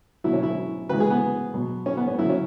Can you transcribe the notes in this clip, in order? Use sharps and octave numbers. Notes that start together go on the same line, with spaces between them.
B2 F#3 E4
C#4
E4
C#3 E3 G#3 B4
G#4
B3
B2 F#3
C#4
B3
C#4
C#3 F#3 E4
C#4